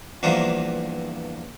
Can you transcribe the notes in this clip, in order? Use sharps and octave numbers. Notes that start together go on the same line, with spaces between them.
E2 G2 E3 F3 A#3